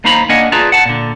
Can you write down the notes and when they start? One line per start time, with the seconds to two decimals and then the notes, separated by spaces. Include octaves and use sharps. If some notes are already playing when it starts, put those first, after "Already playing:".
0.04 D#2 A#3 D#4 C5 A#5 B5
0.29 A#3 D4 A#4 D#5 F#5 G#5
0.52 F4 G#4 B4 D5 A5 A#5
0.72 F#5 A5
0.86 A#2 D3